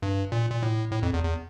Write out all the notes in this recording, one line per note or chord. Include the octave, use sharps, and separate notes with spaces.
G2
A#2
A#2
A2
A2
F2
E2
E2